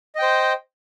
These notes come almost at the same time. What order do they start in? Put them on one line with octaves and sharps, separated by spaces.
D#5 G5 C5